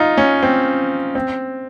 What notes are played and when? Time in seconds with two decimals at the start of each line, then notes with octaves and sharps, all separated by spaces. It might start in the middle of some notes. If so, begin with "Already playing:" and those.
Already playing: D#4 F4
0.17 C#4
0.43 C4
1.15 C4